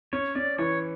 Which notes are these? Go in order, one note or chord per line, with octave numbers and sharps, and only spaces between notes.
C#4 C#5
C#4 D5
E3 C#5